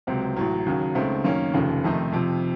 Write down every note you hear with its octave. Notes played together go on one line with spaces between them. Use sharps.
C#2 C3 F#3 C4
A1 A2 F#3
D#2 C#3 F#3
C#2 C#3 A3 C4 D#4
F#2 D#3 A#3 C#4
F1 D#2 C#3 F3
F2 C3 D#3 A3 D#4
F2 C3 F3